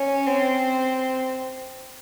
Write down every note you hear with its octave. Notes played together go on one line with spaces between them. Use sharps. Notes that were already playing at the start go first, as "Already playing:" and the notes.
Already playing: C#4
C4